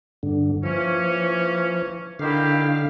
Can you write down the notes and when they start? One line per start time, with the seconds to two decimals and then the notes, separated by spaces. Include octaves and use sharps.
0.23 G2 D3
0.63 E3 F3 A#3 C#4
2.19 D3 D#3 E4 G4 F5